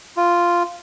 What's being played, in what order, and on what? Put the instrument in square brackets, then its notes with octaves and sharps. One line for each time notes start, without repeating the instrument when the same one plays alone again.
[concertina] F4